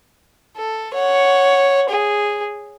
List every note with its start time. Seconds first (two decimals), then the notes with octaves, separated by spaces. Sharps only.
0.57 A4
0.94 C#5 F#5
1.89 G#4